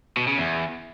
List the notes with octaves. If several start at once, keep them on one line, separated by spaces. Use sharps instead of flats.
B2
C#3
E2